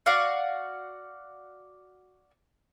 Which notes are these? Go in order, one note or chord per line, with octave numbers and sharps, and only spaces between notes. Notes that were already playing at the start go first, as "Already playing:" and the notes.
F#4 D5 F5 F#5